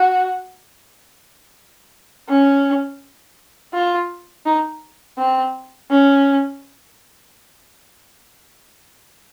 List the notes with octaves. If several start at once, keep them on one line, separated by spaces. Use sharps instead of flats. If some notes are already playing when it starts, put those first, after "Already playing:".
Already playing: F#4
C#4
F4
D#4
C4
C#4